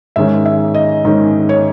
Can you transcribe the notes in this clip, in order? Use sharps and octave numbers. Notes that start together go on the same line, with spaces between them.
G#2 D#3 G#3 C#4 E5
E5
D#5
G#2 D#3 G#3 C#4
C#5